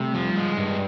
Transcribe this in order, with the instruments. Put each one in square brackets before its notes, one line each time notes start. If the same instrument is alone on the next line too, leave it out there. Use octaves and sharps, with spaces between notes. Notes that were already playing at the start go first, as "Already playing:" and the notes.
Already playing: [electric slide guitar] C3 [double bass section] G3 A3
[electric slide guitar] F3
G#3
G2